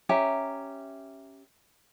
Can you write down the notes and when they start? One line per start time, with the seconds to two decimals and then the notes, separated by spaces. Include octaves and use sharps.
0.09 C#4 G4 E5 A#5